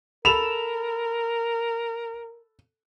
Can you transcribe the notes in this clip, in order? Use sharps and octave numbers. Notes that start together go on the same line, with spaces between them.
A4 A#4 B5 E7 F7